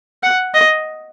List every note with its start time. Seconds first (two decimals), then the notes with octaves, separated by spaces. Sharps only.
0.23 F#5
0.54 D#5